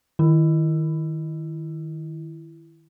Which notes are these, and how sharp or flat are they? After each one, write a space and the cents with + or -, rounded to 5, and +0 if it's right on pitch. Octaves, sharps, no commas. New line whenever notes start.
D#3 +0 E4 +15